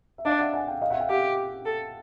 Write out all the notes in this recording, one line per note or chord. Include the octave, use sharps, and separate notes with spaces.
E5
D4 D#5 F5
E5 F#5
F#5 G#5
F5 G5
D#5 F5
E5 F#5
F5 G5
G4 E5 F#5
A4